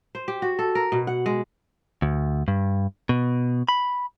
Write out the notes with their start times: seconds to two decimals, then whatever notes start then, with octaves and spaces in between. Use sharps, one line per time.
0.15 C5
0.28 G4
0.42 F#4
0.59 A4
0.75 A#4
0.92 B2
1.07 F#5
1.26 G#3
2.02 D2
2.48 G2
3.09 B2
3.69 B5